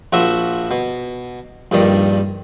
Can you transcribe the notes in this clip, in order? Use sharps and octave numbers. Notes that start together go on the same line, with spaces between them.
A#1 F3 F#4 E5
B2
A#1 G2 D#3 D5